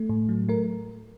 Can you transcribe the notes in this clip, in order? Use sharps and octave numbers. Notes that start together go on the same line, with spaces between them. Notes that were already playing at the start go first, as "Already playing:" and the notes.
Already playing: A3
A2
F#3
A3 A#4